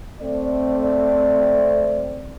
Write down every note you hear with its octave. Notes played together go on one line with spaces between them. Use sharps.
A3 C4 D5